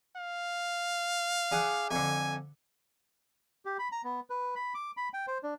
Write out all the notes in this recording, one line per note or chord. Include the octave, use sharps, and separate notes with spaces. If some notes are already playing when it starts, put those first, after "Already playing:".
F5
D4 G#4 F#5
F2 D3 G#5
G4
B5
A#5
B3
B4
B5
D6
B5
G5
C5
D4